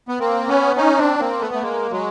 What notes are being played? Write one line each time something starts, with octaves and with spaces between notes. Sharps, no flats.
B3
A#3 C4
B3 C#4
C#4 D#4
C4 D4
A#3 C4
A3 B3
A3
G#3 A#3
F#3 G#3